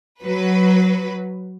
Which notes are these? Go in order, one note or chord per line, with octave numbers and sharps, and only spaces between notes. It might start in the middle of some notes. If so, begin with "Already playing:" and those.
F#3 B4